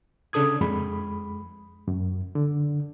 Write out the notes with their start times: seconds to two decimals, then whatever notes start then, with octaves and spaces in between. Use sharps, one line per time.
0.33 C#3 D4 A4 D#6 G#6
0.61 F2 G#3 B5
1.88 F#2
2.35 D3